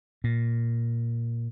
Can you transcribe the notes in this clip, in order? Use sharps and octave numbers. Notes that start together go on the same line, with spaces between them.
A#2